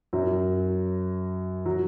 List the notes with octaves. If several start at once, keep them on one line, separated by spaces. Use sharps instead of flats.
F#2 F#3
F#3